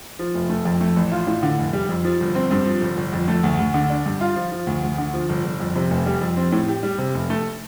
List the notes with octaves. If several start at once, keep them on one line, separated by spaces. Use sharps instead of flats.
F3
F1
A3
F2
A3
A1
F4
A2
D3
F1
G3
F2
F3
G1
C4
G2
F3
G1
G1
F2
A3
D2
D2
D3
D4
G2
F4
F3
F3
D2
D2
D3
F3
G1
G1
F2
C3
F1
G3
F2
C4
A2
G4
G3
C3
F1
A3